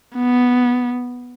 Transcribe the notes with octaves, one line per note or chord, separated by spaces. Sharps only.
B3